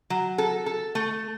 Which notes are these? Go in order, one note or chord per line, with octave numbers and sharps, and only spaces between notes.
F#3
A4
A4
A3